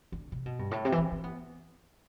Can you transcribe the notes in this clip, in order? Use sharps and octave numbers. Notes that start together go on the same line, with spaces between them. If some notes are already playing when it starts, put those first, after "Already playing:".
D3
C3
B2
G2
A2
C3
E3
D3
C4
B3